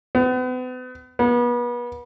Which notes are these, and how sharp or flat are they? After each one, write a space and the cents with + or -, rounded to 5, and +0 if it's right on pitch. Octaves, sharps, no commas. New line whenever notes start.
B3 +40
B3 -35